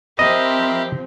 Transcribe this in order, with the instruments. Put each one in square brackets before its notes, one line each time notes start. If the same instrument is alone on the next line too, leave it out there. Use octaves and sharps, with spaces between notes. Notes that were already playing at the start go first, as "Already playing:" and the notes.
[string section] F3 C4 [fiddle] G4 [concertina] A#4 E5 B5 [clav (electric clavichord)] D#5